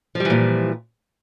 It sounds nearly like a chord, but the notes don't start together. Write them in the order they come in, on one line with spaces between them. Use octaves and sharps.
F3 G3 E3 A#2